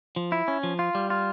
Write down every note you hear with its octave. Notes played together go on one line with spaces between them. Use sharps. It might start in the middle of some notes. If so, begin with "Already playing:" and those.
F3
E4
C#4
F3
F4
G3
F4